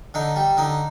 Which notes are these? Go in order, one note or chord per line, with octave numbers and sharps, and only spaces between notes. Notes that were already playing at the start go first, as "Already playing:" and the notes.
D3 D#4
G3
D3 D#4